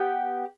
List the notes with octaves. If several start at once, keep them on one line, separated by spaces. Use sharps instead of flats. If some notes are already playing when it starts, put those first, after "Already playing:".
Already playing: B3 G4